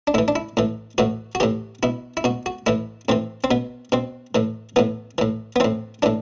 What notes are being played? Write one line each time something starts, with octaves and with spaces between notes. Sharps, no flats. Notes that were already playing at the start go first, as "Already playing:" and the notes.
D4
A2 E3 E4
D4
E4
A2 E3
A2 E3 F#4
F#4
A2 E3 G4
B2 E4
E4
B2 F#4
F#4
A2 E3 E4
A2 E3 C4
C4
B2 B3
B2 C4
A2 E3
A2 E3 B3
A2 E3
B3
A2 E3 C4
A2 E3 D4